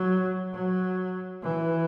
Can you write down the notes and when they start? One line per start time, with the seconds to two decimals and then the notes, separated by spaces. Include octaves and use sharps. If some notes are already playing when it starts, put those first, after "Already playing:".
Already playing: F#3
0.53 F#3
1.41 E3